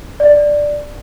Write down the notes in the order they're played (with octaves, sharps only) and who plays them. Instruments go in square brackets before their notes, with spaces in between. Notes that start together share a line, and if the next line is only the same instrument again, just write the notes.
[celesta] D5